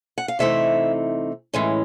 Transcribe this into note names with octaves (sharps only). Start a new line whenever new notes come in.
F#5
F5
C3 E3 A3 C4 D#4 E5
A2 E3 G#3 C#4